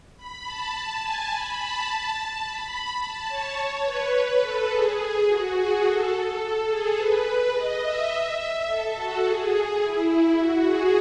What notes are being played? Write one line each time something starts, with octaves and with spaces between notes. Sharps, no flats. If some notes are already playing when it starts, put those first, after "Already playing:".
B5
A5
A5
G#5
B5
A5
A5
B5
A5
C#5
B4
A4
G#4
F#4
G#4
A4
A4
G#4
B4
D#5
E5
A4
F#4
G#4
G#4
E4
E4
F#4
G#4